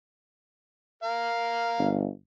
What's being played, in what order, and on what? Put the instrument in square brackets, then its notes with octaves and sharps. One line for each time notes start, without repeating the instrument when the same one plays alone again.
[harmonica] A#4 F5
[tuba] G1